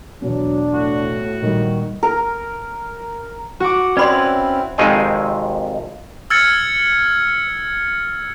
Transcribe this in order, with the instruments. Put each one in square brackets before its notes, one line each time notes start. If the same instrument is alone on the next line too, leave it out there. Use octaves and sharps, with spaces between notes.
[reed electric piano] E2 B2 B3 [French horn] F#3 [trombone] D4
[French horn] A2 [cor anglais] F#4
[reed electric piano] A#2 G3 [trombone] D#3
[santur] A#4
[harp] F#4 D6 [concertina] F#5
[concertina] C4 [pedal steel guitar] C#4 E4 B4 [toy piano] D5 B5 C6
[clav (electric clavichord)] G#1 F2 C3 D#3 G#3 G#5
[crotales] E6 F6 G#6 A6 C#7